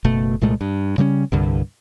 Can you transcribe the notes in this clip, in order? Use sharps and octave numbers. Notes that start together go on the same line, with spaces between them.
F#1 B2 A3
C2 A#2 G#3 A3
G2
C#3 G3 G#3 C#4
C2 G2 D3